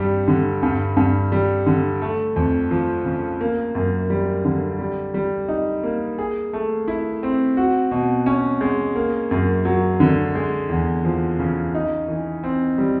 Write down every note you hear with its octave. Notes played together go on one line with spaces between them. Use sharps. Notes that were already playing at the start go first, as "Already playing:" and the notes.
Already playing: G2 G3
D3
G2
G2
G3
D3
A3
F2
F3
C#3
A#3
F#2
G3
D3
G3
G3
D#4
A#3
G#4
A3
E4
C4
F#4
B2
C#4
G#3
A#3
F#2
F#3
D3
G#3
E2
F3
C#3
D#4
E3
C4
G3